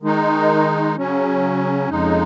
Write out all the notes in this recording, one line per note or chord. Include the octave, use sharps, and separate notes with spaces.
D#3 G#3 D#4
C#3 F#3 C#4
F2 C#3 G#3 D#4